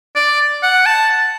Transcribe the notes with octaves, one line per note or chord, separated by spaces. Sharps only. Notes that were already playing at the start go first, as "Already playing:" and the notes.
D5
F#5
A5